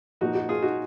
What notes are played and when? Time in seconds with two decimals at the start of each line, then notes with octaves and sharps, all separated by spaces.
0.21 A#2 F3 D#4 F#4
0.35 D#4 F#4
0.49 F4 G#4
0.62 D#4 F#4